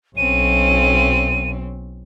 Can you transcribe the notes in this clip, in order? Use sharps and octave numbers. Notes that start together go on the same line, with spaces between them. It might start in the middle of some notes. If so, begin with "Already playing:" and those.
B1 C4 C#4 D#7